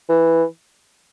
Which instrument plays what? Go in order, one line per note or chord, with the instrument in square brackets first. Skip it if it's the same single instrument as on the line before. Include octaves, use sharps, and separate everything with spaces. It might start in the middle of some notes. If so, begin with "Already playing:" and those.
[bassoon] E3